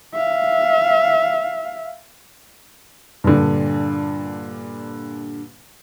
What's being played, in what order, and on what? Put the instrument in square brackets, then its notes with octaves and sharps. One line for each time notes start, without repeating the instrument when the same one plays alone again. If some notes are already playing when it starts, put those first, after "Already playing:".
[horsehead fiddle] E5 F5
[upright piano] G2 A#2 D3